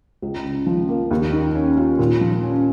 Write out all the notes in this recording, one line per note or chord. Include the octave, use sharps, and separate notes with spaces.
C#2
C#3
F3
A#3
D#2
D#3
C#4
F4
A#2
F3
C#4